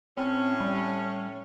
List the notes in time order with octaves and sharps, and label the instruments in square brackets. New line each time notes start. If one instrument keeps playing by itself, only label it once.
[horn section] A2 C#4 [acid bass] C4
[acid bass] G3